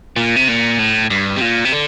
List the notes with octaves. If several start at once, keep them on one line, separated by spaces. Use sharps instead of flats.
A#2
C3
A#2
A2
G2
C3
A#2
C3
D3